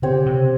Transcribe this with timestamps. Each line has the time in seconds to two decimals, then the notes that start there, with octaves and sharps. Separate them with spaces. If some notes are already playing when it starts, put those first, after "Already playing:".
0.02 C#3 C4 G4 C#5
0.26 C3